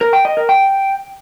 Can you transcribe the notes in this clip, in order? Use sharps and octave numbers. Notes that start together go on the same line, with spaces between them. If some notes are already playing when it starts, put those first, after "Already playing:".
A#4
G5
D#5
A#4
G5